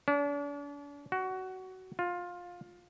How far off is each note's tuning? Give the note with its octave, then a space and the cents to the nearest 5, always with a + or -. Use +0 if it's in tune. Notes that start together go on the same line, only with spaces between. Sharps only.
D4 -40
F#4 +15
F4 +15